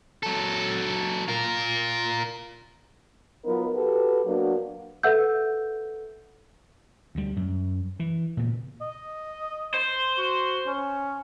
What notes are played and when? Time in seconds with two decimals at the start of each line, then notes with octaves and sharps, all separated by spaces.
0.23 F#3 A4
1.28 F4 A#4
3.45 F#3 B3 D#4 F4 A#4
3.74 F#4 G4 A4 B4
4.24 F#3 A#3 B3 D4 F#4 A#4
5.03 A4 B4 E5 F#5 E6 G6
7.15 D2 G3
7.36 F#2
8.00 E3
8.37 A#2 C#3
8.81 D#5
9.74 C5
10.18 F#4
10.67 C#4